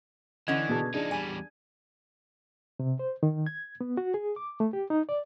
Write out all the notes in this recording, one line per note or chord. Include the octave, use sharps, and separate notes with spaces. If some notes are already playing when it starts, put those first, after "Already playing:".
D3 E3 C#4 D#5 F#5 G#6
B2 G#4 A5
F3 D4 D#4 G#4
E2 G3 G#5
C3
C5
D#3
G#6
B3
F#4
G#4
D6
A3
G4
D#4
D5